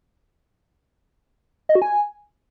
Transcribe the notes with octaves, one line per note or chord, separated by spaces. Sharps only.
D#5
F#4
G#5